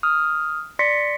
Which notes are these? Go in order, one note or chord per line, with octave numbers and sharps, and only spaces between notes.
D#6 F6
D5 C6 A#6 B6 C#7